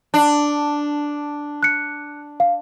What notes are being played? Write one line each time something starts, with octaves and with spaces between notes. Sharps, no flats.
D4
F#6 C#7
F5